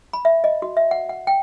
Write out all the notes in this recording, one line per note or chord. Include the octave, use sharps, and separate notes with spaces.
B5
E5
D#5
F#4
E5
F#5
F#5
G5